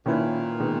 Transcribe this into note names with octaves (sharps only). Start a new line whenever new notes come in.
A#2 D#3 A#3 C#4 E4 B4
D#3 G#3 B3